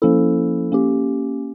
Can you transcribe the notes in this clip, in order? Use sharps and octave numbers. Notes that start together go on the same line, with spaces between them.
F3 A#3 C#4 E4 A4
A#3 C#4 G4